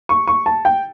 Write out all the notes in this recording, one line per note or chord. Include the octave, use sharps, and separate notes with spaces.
C#6
C#6
A5
G5